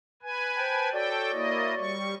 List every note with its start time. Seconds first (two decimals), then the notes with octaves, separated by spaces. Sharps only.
0.22 B4 G#5
0.56 C5 G5 A5
0.92 F#4 A4 C#5 D5 G5
1.33 A#3 E4 D#5
1.78 G3 C#6